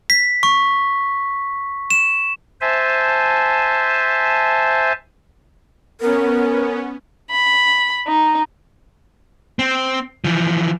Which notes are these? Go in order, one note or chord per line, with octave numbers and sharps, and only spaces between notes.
B6
C#6
E7
C5 E5 G#5 A5
B3 C#4 A#4
B5
D#4
C4
E3 F3